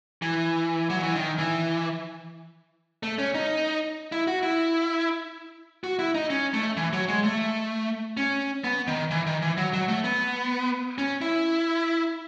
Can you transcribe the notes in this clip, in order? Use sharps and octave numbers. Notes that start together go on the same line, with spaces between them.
E3
F#3
E3
D#3
E3
A3
C#4
D#4
E4
F#4
E4
F#4
E4
D#4
C#4
A3
E3
F#3
G#3
A3
C#4
B3
D#3
E3
D#3
E3
F#3
F#3
A3
B3
C#4
E4